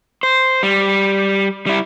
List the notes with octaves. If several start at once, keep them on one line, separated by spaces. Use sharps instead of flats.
C5
G3
G3 E4